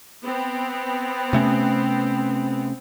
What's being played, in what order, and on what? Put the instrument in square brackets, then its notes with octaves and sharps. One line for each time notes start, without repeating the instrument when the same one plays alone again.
[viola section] B3 C4
[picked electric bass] C3 A3 C#4